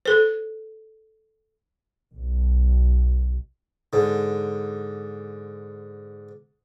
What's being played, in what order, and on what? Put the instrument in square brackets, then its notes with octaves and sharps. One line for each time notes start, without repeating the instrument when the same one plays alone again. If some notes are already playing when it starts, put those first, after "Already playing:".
[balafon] A4 C5
[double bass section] B1
[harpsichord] G#2 D3